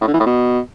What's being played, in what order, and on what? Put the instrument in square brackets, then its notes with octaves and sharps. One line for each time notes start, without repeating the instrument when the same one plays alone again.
[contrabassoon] A2
D3
E3
A2
B2